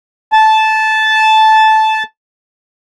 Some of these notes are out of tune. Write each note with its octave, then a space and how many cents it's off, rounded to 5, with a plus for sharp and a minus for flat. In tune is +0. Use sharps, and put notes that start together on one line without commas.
A5 -10